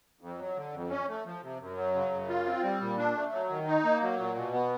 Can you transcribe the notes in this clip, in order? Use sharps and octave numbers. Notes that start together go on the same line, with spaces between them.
F2
F#3
D3
F2
C#4
A3
F3
C3
F#2
F#3
C#3
F#2
F4
C4
G3
A#2
D4
A3
F#3
D#3
D#4
A#3
F#3
A#2
B2
B3